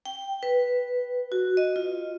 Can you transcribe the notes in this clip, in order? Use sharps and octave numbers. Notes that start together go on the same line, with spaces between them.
G5
B4
F#4
D#5
F4